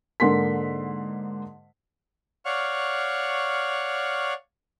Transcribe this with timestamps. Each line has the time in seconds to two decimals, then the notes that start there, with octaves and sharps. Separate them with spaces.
0.20 G#2 D3 A#3 C6 B6
2.45 C#5 D5 F5 F#5 C#6 F6